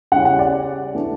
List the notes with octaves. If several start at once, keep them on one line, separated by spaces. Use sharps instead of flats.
C#3 G3 C#4 E4 F#5
F#5
D5
E3 A3 D4